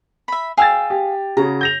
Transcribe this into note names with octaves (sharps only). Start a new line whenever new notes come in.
E5 B5
G#4 F5 G5 E6 A6
G4
C#3 F#4 G#4 A#5
G6 A#6 F7